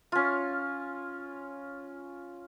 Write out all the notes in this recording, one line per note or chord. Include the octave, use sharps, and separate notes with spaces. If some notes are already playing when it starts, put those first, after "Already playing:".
C#4 F4